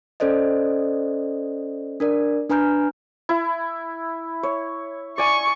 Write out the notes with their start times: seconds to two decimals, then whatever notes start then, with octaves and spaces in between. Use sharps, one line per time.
0.20 C#4 A4 C5 D5 D#5
2.00 D4 A#4 D5
2.50 D4 B4 G#5 A#5 F6 G6
3.29 E4
4.43 C#5
5.18 D5 G#5 C#6